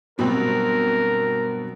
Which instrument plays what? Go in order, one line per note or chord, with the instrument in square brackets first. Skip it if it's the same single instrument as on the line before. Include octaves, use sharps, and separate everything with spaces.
[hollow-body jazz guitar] G2 F#3 B5 [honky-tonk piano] B2 C4 [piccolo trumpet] A#4